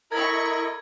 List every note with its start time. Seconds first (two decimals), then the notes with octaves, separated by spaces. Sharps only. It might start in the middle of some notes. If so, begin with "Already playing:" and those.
0.12 E4 A4 A#4 D#5 B5 C#6 G#6